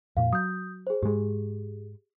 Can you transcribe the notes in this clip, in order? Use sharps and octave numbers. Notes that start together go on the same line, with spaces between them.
F2 A#2 F5
F#3 D#6 G6
G#4 C5
G#2 G#3 G4 G#4